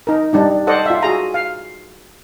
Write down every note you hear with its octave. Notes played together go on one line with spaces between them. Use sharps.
D#4 A#4
G3 D4 D#4
A4 C5 D5 D#5 F#5
F4 E5
F#4 G#4 A#5
F5